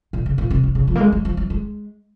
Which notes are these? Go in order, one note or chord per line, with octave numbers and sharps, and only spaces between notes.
A#2
C#3
A#2
C3
C3
C#3
F3
A#3
G#3
F#3
F3
F#3
G#3